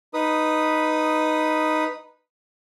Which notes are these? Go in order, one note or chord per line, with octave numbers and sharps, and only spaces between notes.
D#4 B4 D#6